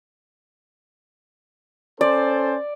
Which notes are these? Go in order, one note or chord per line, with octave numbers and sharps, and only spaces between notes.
C#4 A4 C5 D5